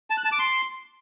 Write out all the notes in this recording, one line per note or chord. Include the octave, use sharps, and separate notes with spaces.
A5
F#6
A5
D6
C6